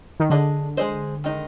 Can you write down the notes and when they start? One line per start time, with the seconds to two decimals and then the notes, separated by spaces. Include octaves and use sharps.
0.20 D#3
0.30 D3 D4 G#4 D#5
0.77 G#3 D#4 G#4 C5 D#5
1.24 D#3 G#3 D#4